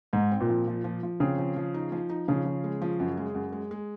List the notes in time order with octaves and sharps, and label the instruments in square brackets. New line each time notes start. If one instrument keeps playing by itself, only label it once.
[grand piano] G#2 [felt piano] D#4
[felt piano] C4
[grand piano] A#2
[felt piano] F3
F3
F3
F3
[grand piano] C#3 [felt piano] C4
[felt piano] F3
F3
D#4
F3
D#4
[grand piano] C#3 [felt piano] F3
[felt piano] F3
G#3
F3
F#2
G#3
F#2
G#3
G#3